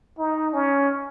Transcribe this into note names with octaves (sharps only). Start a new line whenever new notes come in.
D#4
C#4